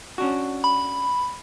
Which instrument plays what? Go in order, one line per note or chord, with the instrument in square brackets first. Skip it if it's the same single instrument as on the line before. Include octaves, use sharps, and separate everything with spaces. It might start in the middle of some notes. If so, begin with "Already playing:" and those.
[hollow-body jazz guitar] C#4 D4 F#4
[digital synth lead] B5